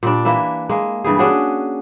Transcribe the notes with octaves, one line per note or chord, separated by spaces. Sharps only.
A#2 G3 D4
E3 A#3 E4 E5
G#3 A#3
G2 E3 G3 G#4
C#4 D4 F#4 G#4